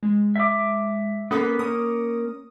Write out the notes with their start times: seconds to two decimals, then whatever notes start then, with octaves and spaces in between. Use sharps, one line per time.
0.03 G#3
0.36 E5 D6
1.31 A#3 B3 C#4 A4 B6
1.59 A#3 C#4 D#6